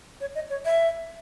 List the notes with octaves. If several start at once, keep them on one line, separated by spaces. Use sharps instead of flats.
C#5
D#5
C#5
E5